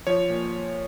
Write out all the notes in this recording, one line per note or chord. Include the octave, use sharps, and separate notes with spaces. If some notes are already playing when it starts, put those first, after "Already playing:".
F3 C#5
A#2